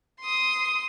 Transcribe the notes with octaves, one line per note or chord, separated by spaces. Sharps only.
C6 D#6